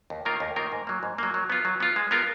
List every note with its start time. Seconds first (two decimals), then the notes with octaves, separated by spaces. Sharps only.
0.10 D#2
0.25 D#3 A#3 F4 A#4
0.40 D#2
0.56 D#3 A#3 F4 A#4
0.72 G#2
0.87 F#3 A#3
1.03 G#2
1.18 F#3 A#3
1.34 F#3
1.50 B3 F4
1.65 F#3
1.80 B3 F4
1.96 G#3
2.11 B3 F4 A#4